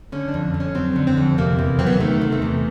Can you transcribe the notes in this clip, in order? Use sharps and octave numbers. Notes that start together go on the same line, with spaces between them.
D3 C#4
D4
F2
F2
C#4
F#3 C4
D3
C4
F2
C3 A#3
E2
F#3 C4
B3
A#3
D#3 A3
C3
A3
E2